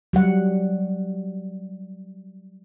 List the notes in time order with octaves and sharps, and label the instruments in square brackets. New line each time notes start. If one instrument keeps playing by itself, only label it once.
[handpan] F#3 G3 F#5